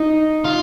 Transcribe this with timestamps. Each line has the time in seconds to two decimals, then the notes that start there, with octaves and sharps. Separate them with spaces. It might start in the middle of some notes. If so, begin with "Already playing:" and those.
Already playing: D#4
0.45 F4